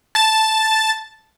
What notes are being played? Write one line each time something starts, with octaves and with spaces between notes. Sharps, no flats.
A5 A6